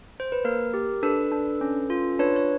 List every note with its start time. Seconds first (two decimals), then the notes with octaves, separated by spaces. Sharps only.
0.20 C5
0.32 B4
0.45 A#3 A#4
0.74 G4
1.03 D4 A4 B4
1.32 D4
1.61 C#4
1.90 F4
2.19 D4 B4 C#5
2.36 C#5